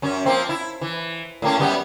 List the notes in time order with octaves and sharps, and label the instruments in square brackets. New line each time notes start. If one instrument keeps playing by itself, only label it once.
[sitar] F#2 C#4
F3 A#3 C4
E4
E3
A2 A#3 C#4
F#2 G3 B3